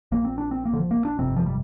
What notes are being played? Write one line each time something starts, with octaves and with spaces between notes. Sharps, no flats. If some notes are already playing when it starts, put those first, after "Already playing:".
A#1 A#2 A#3
C4
D4
C4
A#3
D3
F3
A#3
D4
G1 F2 C3 C4
F3
G3